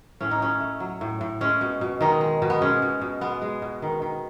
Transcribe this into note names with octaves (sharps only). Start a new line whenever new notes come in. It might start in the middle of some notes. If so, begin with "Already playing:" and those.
A2 C#4
D#4
A2 C#4
A3
F#3
A2
A2
G#3 C#4
B2
B2
D#3 G#3 D#4
G#3
B2
B3
G#3 C#4
B2
B2
G#3 B3
G#3
B2
D#3
D#3